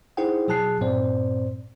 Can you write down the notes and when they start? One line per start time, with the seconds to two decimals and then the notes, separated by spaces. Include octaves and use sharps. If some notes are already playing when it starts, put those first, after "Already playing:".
0.17 D#4 E4 G#4 C5 F#5 G5
0.48 B2 F#3 G#4 A5 F#6 C7
0.81 G2 A#2 C4 C5 D5